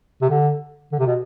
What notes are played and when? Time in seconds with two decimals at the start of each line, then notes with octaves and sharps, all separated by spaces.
0.22 C3
0.30 D3
0.92 D3
0.99 C3
1.07 B2